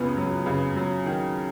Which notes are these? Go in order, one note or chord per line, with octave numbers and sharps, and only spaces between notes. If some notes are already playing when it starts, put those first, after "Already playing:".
Already playing: C#2 C#3 B3
F#3
C#3
F#3
D#3